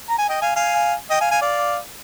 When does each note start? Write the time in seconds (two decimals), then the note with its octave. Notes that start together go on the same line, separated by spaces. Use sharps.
0.09 A#5
0.18 G#5
0.29 D#5 G5
0.42 F5 G#5
0.56 F5 G#5
1.10 D#5 G5
1.21 F5 G#5
1.31 F5 G#5
1.41 D5 F5